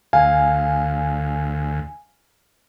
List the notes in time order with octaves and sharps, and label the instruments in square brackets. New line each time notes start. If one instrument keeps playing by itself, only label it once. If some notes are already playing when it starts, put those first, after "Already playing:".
[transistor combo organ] D2 [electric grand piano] F5 [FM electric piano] G#5